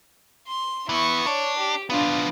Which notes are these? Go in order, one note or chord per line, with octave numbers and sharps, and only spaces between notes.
C6
E3 B3 E4 C#6
D4 C#5
G4
F3 B3 D4 F4